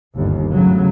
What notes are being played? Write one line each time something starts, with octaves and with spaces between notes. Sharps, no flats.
G1 D#2
A2 C#3 F#3